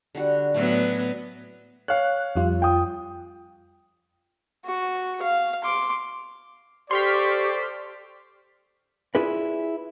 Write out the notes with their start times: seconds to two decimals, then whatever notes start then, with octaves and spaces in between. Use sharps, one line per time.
0.15 D3 G3 F#4
0.54 A2 F#3 A3 B3 C#4 D4
1.88 C#5 F5 F#6
2.36 F2 G3 F4
2.62 G5 D#6
4.65 F#4
5.22 F5
5.64 C6 D6
6.91 G4 A4 C5 D5 C6 C#6 F6 B6
9.15 E4 F4 G#4 B4 D5